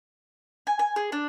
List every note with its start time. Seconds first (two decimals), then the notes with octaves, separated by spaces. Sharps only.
0.67 G#5
0.79 G#5
0.96 G#4
1.12 D4